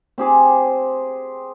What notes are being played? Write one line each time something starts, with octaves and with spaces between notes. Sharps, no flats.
C4 G4 G#4 D6